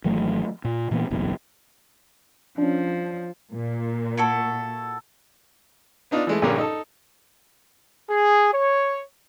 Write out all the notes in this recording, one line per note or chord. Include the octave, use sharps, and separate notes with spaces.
G#1 E3 F#3 A3
A#2
A#2 E3 A#3 B3
F#1 B1 E2 A#2
F3 C#4 D4
A#2
E4 F#4 A4
B3 D4 D#4 F4
E3 G#3 A3
A#1 G2 D3 A#3 C#4 A#4
D#4 A4
G#4
C#5